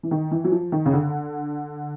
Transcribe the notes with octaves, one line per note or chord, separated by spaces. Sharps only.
E3
D#3
E3
F#3
F3
D#3
C#3
D3